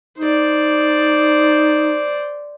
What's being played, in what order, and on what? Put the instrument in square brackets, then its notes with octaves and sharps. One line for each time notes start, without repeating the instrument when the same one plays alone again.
[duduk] D#4 [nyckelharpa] C5 D5